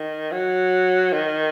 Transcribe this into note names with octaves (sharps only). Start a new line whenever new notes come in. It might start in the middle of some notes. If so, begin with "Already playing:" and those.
Already playing: D#3
F#3
D#3